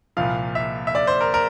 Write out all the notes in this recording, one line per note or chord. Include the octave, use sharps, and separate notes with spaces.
C2 A#2 F3 F5
E5
E5
D5
C5
A#4
A#4